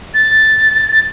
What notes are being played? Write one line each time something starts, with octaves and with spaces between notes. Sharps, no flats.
A6
A6